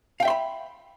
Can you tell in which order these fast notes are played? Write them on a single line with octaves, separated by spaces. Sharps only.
F5 G5 E5 C6 B5